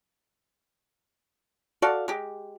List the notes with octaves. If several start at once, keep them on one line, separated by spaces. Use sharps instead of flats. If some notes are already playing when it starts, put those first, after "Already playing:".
F#4 A4 D5 F5
G#3 G4